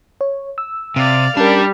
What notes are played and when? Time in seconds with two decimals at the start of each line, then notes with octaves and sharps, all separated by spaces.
0.21 C#5
0.58 E6
0.96 C3 D5 F5
1.37 G3 C#4 D4 A#4